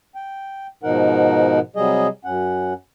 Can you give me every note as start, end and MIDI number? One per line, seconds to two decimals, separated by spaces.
0.15 0.67 79
0.83 1.59 44
0.83 1.59 47
0.83 1.59 53
0.83 1.59 63
0.83 1.59 70
0.83 1.59 78
1.76 2.07 48
1.76 2.07 54
1.76 2.07 55
1.76 2.07 68
1.76 2.07 75
2.25 2.73 42
2.25 2.73 61
2.25 2.73 78